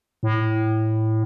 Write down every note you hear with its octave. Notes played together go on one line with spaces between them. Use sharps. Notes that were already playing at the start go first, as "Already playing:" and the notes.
A2